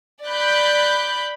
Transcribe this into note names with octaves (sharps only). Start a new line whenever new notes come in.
D5 B5 F#6 G6